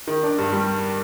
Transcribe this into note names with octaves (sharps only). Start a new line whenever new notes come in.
D#3
D4
G2
G3